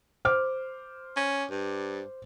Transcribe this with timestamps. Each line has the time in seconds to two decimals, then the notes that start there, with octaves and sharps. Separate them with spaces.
0.25 C5 D6 F6
1.16 C#4
1.50 G2